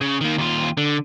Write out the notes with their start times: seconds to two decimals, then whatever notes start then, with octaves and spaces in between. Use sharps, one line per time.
0.01 C#3
0.21 D#3 A#3
0.38 D#2 F4
0.77 D3